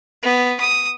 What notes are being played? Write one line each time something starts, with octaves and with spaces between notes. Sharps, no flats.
B3
D#6